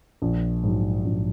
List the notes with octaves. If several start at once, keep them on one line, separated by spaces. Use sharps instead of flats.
A#1
G#2 F#3
A#1